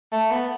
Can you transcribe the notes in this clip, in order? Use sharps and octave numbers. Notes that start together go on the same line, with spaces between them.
A3
B3